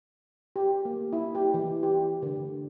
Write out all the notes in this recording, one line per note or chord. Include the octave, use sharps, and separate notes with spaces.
G4
A#3
E4
G4
E3
G4
D3